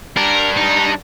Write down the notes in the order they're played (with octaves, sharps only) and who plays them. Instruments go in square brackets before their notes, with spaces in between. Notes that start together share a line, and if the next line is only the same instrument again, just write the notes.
[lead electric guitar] G3 D4 [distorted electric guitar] A#4
[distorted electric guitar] D#4